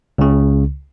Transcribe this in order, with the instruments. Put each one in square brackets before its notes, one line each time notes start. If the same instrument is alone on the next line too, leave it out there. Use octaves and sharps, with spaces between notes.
[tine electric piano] C#2 C#3